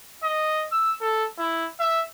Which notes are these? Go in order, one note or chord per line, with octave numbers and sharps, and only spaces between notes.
D#5
E6
A4
E4
E5